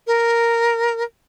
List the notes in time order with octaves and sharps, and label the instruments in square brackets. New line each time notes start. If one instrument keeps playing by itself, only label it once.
[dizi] A#4